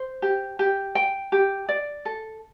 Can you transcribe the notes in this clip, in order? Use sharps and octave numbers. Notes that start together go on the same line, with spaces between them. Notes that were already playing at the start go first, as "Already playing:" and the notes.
Already playing: C5
G4
G4
G5
G4
D5
A4